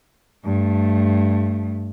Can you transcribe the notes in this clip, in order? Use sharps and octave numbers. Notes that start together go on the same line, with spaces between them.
G2 A3